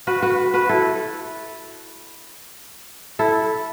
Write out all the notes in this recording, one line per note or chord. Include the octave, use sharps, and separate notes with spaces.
F#4 B4
F#4 B4
F#4 B4
E4 A4
E4 A4